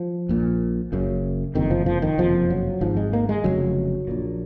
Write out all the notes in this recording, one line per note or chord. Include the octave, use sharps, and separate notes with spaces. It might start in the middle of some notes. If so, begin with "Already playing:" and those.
Already playing: F3
A#1 A#2
F#1 F#2 C#3
F#1 F2 C3 D#3
F3
F3
D#3
F#1 F2 C3 F3
F#3
G#1 G#2 F3
G#3
A#3
G#3
F1 D#2 C#3 F#3
A#1 A#2